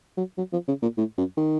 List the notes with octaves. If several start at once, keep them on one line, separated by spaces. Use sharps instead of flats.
F#3
F#3
F3
C#3
A#2
A2
F#2
D#3